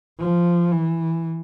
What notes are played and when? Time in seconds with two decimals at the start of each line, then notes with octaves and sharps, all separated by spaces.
0.20 F3
0.72 E3